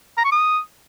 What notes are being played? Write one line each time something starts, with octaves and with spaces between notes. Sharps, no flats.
A#5
C#6
D#6